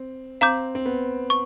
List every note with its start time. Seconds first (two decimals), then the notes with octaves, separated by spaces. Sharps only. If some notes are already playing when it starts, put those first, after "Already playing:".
Already playing: C4
0.41 C4 F5 A#5 D6 G6
0.75 C4
0.86 B3
1.30 C#6